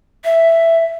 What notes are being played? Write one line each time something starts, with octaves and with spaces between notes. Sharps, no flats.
E5